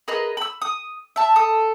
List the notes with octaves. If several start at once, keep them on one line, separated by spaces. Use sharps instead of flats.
G#4 A#4 B4 D#5
B5 E6
D#6
E5 A5
A4 D#6